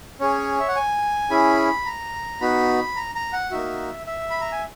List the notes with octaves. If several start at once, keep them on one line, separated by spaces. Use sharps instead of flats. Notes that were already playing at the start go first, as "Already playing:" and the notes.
C#4 G#4 C#5
E5
F#5
G#5
C#4 E4 G#4 B5
A#5
B3 D#4 F#4 B5
A#5
A#5
F#5
A#3 D#4 F#4 E5
E5
B5
A#5
G#5